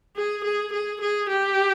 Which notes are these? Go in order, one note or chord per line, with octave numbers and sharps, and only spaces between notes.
G#4
G#4
G#4
G#4
G4